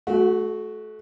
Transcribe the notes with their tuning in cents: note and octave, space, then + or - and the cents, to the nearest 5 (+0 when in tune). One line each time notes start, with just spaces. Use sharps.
A3 -30 F#4 +0